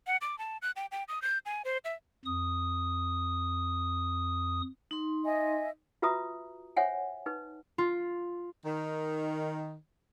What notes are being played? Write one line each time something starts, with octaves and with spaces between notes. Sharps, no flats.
F#5
D6
A5
F#6
G5
G5
D#6
G6
G#5
C5
E5
F2 D#6
D#4 C6
D#5 E5 G#5
F4 F#4 B4 E5 A#5 D#6
C5 C#5 E5 F#5 G#5
D#4 B4
F4
D#3